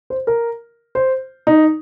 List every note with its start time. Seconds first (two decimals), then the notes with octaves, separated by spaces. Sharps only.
0.10 C5
0.27 A#4
0.95 C5
1.47 D#4